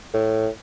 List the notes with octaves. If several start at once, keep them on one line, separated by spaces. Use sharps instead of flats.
A2